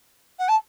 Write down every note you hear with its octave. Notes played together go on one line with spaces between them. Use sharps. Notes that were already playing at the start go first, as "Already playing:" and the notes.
F#5
A5